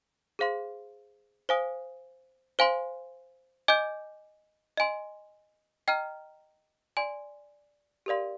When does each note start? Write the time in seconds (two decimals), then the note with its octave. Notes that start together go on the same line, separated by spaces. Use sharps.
0.39 G#4 C5 F5 C6
1.49 C5 F5 G#5 D#6
2.59 C5 F5 G#5 C6
3.68 D#5 G#5 D6 G6
4.77 D#5 G#5 C6
5.88 D#5 G5 A#5 F6
6.97 D5 G#5 C6
8.06 G4 A#4 D5 F5 C6